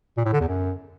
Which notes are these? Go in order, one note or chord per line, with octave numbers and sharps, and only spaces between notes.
A#2
A2
D3
E2
F#2